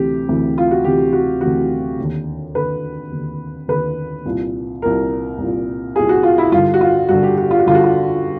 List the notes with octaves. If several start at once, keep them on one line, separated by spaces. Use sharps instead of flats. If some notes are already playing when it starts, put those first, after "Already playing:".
Already playing: D2 C3 E3 G4
D2 C3 E3
F4
F#4
D2 C3 E3 G4
F#4
D2 C3 E3 F#4
D#2 D3
D#2 D3 B4
D#2 D3
D#2 D3 B4
C2 A#2
C2 A#2 A#4
C2 A#2
C2 A#2 G#4
F#4
F4
E4
G2 D3 F4
F#4
F4
G2 D3 F#4
G4
F#4
F4
F#4
G2 D3 F4
F#4
F4